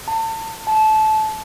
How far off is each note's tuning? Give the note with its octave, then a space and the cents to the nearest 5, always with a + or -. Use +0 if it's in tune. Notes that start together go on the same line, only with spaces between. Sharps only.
A5 +30
A5 -20